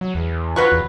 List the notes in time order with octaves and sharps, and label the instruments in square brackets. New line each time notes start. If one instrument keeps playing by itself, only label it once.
[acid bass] F#3
E2
[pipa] F#3 B4 C#6 [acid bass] F4
[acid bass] E2